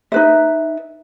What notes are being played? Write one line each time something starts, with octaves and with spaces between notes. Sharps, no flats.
D#4 B4 E5